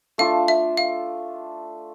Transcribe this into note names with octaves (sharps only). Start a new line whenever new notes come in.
A3 D4 F4 F5
E5
F5